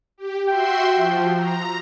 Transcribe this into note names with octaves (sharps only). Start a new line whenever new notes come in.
G4
F#4 E5 G5 C6
F3
A#5